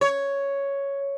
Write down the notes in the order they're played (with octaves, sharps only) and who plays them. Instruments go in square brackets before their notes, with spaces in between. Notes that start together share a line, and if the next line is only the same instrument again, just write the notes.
[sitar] C#5